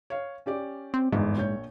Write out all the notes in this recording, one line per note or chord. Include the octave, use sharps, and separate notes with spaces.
C#5 F5
C#4 G4 D5
C4
G1 E2 G#2
A#1 C#5 G6